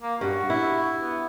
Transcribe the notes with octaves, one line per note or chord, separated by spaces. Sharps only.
A#3
G2 F#4
E4
B3